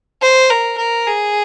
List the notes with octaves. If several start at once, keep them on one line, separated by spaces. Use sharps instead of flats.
C5
A#4
A#4
G#4